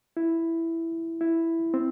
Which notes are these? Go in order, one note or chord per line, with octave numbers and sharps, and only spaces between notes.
E4
E4
C4